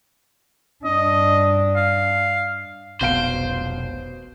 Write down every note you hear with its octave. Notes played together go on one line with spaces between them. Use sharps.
G2 D4 D#5
F5
F1 B1 B2 C5 F5 D7